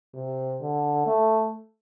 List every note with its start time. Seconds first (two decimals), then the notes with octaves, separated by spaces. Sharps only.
0.14 C3
0.61 D3
1.07 A3